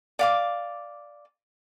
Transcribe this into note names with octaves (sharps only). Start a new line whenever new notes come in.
D5 F5 D6